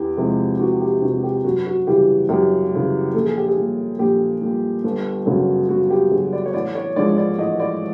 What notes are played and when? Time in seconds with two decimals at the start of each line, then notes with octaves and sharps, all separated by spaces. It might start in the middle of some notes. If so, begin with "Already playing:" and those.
Already playing: E2 G4
0.17 C3 F3 G#3
0.60 E2 F#4
0.81 G4
1.02 C3 F3 G#3 F#4
1.23 G4
1.44 F#2 F#4
1.67 F#4
1.87 C#3 E3 G3 G4
2.29 F#2 G4
2.72 C#3 E3 G3
3.14 A#1 A4
3.26 G#4
3.37 G4
3.48 G#4
3.57 A#2 G3
3.99 A#1 G4
4.42 A#2 G3
4.84 G1
5.26 F#2 C#3 F#3
5.69 G1 F#4
5.90 G4
6.11 F#2 C#3 F#3 G#4
6.33 D5
6.46 C#5
6.54 A1 D5
6.75 C#5
6.96 G#2 F3 G#3 D5
7.17 D5
7.39 A1 D#5
7.60 D5